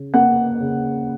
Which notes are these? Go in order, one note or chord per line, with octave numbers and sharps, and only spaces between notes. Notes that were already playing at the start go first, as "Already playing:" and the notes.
Already playing: C#3
A#3 F#5
C#3